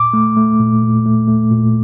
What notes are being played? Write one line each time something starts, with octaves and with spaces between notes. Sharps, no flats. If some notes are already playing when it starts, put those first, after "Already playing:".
Already playing: A#2 D6
A3
A3
A#2
A#2
A3
A3
A#2